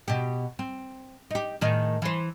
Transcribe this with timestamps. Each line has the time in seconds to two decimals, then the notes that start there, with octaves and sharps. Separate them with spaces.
0.08 B2 G4
0.59 C4
1.31 D#4 G4
1.61 A2 D#3 G#4
2.02 E3 C5